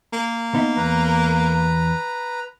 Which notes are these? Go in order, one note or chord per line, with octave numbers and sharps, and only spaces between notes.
A#3
B3 D#4 E5
E2 B4 A#5